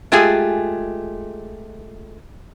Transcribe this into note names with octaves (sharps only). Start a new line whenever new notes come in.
G#3 A3 F4 G4 G#4 G#5